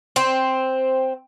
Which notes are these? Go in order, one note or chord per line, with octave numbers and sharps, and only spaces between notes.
C4